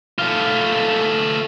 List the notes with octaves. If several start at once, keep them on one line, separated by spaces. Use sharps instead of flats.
A3 F4